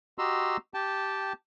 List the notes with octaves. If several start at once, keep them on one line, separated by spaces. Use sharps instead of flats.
F#4 G4 D#5 A#5 C6 E6
G4 G5 A5